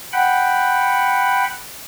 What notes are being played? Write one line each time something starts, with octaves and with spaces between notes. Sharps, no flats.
F#5 G5 B5